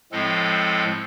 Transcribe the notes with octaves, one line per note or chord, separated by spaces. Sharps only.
A2 F3 G#3 C4 A4